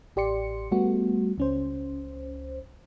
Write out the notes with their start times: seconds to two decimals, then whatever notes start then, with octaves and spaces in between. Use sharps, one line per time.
0.16 A1 G4 D5 C6 C#7
0.72 G3 A3 B3 F#4
1.38 C#2 C#4 C5